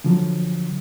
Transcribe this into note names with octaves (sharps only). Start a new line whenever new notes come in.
D3 F3 F#3